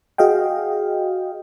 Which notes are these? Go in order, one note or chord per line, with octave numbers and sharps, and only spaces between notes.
F#4 G#4 D#5 F5 G5